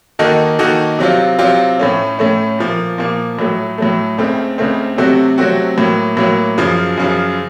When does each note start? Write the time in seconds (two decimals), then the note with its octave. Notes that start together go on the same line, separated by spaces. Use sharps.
0.19 D#3 A#3 D#4 F#4 A4
0.59 D#3 A#3 D#4 F#4 A4
0.99 C3 F#3 C4 F4
1.39 C3 F#3 C4 F4
1.79 A2 A3 C#4
2.19 A2 A3 C#4
2.59 A#2 F3 A#3
2.98 A#2 F3 A#3
3.39 A2 F#3 A3
3.78 A2 F#3 A3
4.18 C#2 C#3 A3 C4
4.58 C#2 C#3 A3 C4
4.97 C3 F#3 A3 C4 F#4
5.38 C3 F#3 A3 C4 F#4
5.77 A2 F#3 A#3
6.17 A2 F#3 A#3
6.58 F#2 C#3 F3
6.97 F#2 C#3 F3